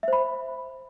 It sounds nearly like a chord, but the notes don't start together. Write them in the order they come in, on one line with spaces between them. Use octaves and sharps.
E5 C5 B5